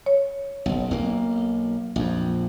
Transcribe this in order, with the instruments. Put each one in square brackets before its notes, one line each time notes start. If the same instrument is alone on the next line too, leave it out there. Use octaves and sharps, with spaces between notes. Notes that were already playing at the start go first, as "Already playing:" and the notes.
[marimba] C#5
[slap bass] F#1 B1
B1 A#3
A#1 F2